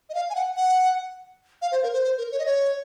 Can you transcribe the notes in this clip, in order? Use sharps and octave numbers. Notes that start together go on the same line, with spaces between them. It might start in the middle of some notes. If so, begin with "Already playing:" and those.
D#5
F5
G#5
F#5
F#5
F5
C5
A#4
C5
C5
A#4
C#5
D#5
C#5